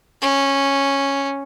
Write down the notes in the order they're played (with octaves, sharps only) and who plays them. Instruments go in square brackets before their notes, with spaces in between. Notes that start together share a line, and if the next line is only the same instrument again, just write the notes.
[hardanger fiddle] C#4